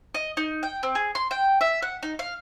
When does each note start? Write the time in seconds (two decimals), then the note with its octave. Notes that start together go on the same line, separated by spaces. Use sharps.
0.14 D#5
0.37 D#4
0.63 G5
0.83 C4
0.95 G#4
1.15 C6
1.31 G5
1.61 E5
1.82 F#5
2.03 D#4
2.19 F5